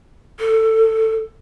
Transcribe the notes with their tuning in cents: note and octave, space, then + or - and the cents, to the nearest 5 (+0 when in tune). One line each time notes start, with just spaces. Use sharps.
A4 +15